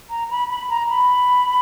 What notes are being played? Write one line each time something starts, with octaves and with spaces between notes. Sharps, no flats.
A#5
B5
B5
A#5
B5